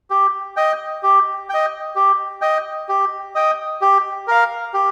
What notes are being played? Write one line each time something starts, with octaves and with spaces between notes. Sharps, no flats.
G4
D#5 G5
G4
D#5 G5
G4
D#5 G5
G4
D#5 G5
G4
A#4 F5
G4